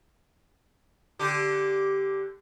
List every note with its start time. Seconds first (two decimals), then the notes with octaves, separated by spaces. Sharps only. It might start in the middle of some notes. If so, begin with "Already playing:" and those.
1.19 D3 G4